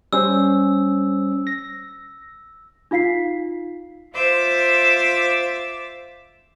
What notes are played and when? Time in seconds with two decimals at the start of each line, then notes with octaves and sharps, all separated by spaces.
0.13 G3 C#4 C5 E6
1.47 A#6
2.91 D#4 F4 F5 B6 C7
4.14 F4 C5 E5 D6 E6